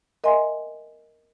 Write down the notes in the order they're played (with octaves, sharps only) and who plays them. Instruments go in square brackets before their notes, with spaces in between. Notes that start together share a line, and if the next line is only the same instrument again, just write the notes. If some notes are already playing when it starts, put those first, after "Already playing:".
[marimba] A#4 D#5 E5 F#5 G#5 C6